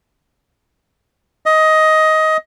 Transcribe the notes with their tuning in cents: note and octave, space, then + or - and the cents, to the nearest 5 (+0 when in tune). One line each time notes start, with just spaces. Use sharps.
D#5 +15